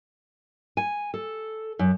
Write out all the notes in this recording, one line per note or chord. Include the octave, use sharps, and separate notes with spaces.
G#5
A4
F#2